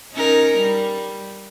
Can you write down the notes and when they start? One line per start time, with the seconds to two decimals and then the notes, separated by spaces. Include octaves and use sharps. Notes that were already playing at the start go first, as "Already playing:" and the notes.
0.13 C#4 D#4 A#4
0.58 G3